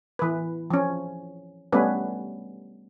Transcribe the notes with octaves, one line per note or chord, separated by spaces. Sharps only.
E3 B4
F3 C#4
G3 A3 B3 C#4 B4